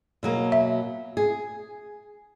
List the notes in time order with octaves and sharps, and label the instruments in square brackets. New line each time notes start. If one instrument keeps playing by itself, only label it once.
[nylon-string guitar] B2 F#3 A#3
[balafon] E5
[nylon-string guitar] G#4